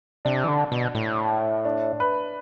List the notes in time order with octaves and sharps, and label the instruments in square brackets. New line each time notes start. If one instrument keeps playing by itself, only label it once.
[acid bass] C3 [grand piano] D4
[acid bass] E3
D3
B2
A2
[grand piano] D4
B4